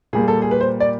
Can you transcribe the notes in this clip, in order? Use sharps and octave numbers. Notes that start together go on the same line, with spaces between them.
A#2 G3 A#3 G#4
A4
G#4
B4
C5
D5